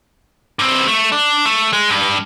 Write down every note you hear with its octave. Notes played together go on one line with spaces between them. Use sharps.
G2 C4
A3
D4
A3
G#3
G2